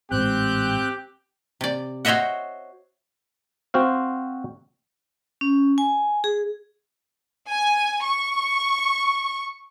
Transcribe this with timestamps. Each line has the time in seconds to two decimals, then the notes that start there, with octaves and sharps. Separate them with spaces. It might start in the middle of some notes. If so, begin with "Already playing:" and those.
0.11 A1 G#2 C4 G4 F#6 G6
1.61 C3 D5
2.05 F#4 C5 C#5 D#5 E5 F#5
3.74 C4 F#4 C5 F5
5.41 C#4
5.78 G#5
6.24 G#4
7.50 G#5
8.05 C#6